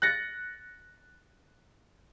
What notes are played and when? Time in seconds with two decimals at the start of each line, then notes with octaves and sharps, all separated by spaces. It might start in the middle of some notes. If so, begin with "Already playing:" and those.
0.02 F#6 A6 A#6 C#7